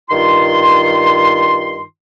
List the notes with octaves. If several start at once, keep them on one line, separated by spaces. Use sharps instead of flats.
G2 D#3 F4 C6